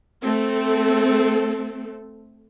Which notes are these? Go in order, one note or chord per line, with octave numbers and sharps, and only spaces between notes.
A3 C4 A4